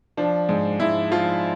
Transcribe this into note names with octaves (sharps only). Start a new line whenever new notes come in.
F3 D4
G#2
G#2 E4
F3 F4